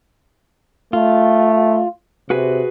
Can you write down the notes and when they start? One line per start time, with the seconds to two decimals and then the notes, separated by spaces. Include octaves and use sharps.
0.93 A3 F4
2.30 C3 F#4 G#4 B4